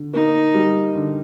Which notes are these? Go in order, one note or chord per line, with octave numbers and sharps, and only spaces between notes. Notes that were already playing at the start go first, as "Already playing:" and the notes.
Already playing: D3
A#3 D#4
G3
D3